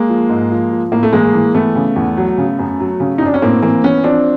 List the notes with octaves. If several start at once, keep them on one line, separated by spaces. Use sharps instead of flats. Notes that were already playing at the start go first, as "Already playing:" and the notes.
Already playing: G#3 A#3
F3
G#2
F3
F3
A2 A#3
A3
E3 G#3 A#3
E3
E3 A3 B3
C#3
E2
F#3
C#3
F#2
F#3
C#3
D#4
F#2 D4
C#4
A2 A#3 C4
E3 A#3 C4
E3 B3 C#4
F3 C4 D4